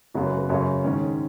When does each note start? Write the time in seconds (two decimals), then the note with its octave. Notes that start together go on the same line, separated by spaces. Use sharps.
0.14 F#2 C#3 F#4
0.26 B4
0.38 B4
0.50 F#2 C#3 C#5
0.84 G#2 D#3 C#4